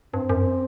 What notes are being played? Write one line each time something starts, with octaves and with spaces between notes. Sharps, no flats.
G2 C4
F#2